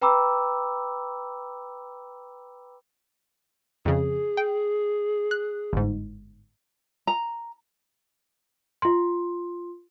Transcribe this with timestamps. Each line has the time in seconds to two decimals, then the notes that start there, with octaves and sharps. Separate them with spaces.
0.01 B4 G5 A#5 B5 D6 E6
3.85 F2 C#3 G#4
4.37 G5
5.31 F#6
5.73 G1 G#2
7.07 A#5
8.82 F4 C6